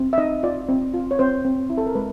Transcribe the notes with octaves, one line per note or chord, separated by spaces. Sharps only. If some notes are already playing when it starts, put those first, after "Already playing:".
Already playing: C4
E5
D#4 D#5
F4 D5
C4
F4
C#5
C4 C5
C4
E4
A4
A#4
G#3 B4